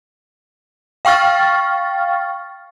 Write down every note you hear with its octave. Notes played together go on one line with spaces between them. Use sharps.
F5 G5 C#6 F6 A6